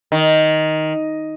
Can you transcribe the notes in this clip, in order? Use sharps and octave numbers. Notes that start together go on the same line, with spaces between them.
D#3